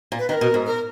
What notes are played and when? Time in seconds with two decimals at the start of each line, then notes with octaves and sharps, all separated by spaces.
0.12 A#2
0.19 B4
0.29 D#3 B4
0.34 A#4
0.41 B2
0.54 G#2
0.66 A#4